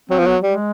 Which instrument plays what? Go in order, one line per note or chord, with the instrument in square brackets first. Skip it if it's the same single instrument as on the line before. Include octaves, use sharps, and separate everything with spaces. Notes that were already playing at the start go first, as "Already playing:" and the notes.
[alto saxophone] F#3 [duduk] C4
[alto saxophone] F3
[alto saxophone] F#3 [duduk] B3
[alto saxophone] G3 [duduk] G#3